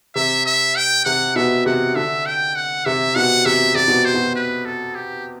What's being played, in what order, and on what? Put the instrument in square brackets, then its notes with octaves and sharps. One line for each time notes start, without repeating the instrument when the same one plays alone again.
[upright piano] C3 [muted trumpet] E5
[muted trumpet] E5
G5
[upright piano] C3 [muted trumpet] F#5
[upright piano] B2 [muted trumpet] E5
[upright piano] C3 [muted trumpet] F#5
[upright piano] D3 [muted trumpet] E5
[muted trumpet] G5
F#5
[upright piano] C3 [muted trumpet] E5
[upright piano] B2 [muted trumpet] F#5
[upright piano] C3 [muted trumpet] E5
[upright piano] C3 [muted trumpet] D5
[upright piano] B2
[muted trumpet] C5
[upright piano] B2
[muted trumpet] B4
A4
G4